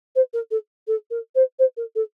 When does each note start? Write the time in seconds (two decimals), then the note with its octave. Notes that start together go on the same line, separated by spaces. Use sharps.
0.15 C5
0.33 A#4
0.51 A4
0.87 A4
1.10 A#4
1.35 C5
1.59 C5
1.77 A#4
1.95 A4